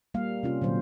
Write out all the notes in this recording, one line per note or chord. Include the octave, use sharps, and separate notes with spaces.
G3 A#3 F5
C3 C#4 F4
A#2 D3 F#3 C5